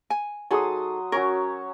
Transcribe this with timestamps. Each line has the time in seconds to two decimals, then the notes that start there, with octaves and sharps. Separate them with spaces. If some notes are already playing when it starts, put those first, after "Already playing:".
0.10 G#5
0.51 F#3 D#4 G#4 A4 C6 D#6
1.12 F#3 C#4 A#4 C#5